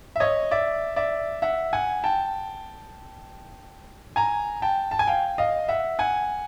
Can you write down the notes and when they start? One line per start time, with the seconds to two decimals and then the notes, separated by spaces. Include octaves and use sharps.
0.16 E5
0.20 C#5 D#5
0.51 D5 E5
0.96 D5 E5
1.42 E5 F#5
1.73 F#5 G#5
2.04 G5 A5
4.16 G#5 A#5
4.62 G5 A5
4.91 A5
4.99 G#5
5.07 F5 G5
5.38 D#5 F5
5.68 E5 F#5
5.99 F#5 G#5